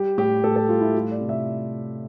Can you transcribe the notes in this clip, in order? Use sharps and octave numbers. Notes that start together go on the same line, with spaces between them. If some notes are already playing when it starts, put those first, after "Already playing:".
Already playing: G3 G4
A2 G4
A2 A4
A4
G3 F4
E4
G3 F4
D5
C3
E5